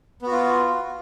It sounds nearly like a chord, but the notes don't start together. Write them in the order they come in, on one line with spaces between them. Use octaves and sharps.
B3 F#4 F4